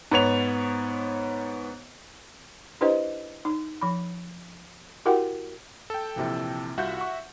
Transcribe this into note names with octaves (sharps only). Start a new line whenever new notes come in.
G#2 B3 C#5 F7
D4 E4 G4 B4 C5 D#5
D#4
F3 B5
E4 F#4 G4 A#4 F#5 G5
A4 G5
A#1 C3 E3
C2 F4 F#4 E5 F#5 G6
C#6